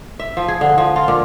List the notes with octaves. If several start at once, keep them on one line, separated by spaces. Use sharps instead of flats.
E5
F3
G#4
D3
F3
F4
A#2